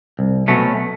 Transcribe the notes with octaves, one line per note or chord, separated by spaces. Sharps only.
C2
B2 F#3 A3 C#4